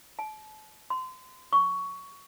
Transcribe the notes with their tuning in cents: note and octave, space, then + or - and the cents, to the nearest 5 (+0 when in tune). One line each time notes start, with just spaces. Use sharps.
A5 -35
C6 -30
C#6 +15